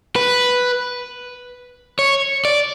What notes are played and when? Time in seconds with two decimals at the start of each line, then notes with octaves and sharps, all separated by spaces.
0.16 B4
1.99 C#5
2.45 D5